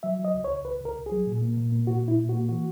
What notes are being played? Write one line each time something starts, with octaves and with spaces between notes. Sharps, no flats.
F#3 E5
F#3
D#5
C#2
C#5
C#2
C#2 B4
C#2
A#4
C#2
G#4
F#3
A#2
A#3
A#2
A#3
A#2 F#4
A#2 E4
A#2
F#4
A#3
E3 F#4